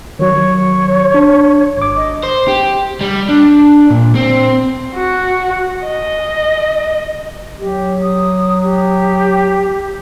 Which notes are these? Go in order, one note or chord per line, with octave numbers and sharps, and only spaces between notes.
D#3 F#3 C#5
D4
G#1 D6
D#5
C5
G4
G3
D4
A#2
C4
F#4
D#5
F#3 G4
D#6
G4